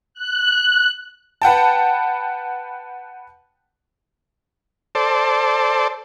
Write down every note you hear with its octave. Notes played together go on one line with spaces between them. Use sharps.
F#6
B4 F#5 G5 A5
A4 C5 D5